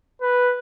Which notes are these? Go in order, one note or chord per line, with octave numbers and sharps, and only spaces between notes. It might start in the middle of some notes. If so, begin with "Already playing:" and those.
B4